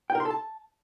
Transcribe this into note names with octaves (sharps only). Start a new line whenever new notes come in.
G5
A#4
C6
A4
A5